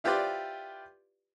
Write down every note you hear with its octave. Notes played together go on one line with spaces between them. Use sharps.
E4 F4 G4 B4 C5 D5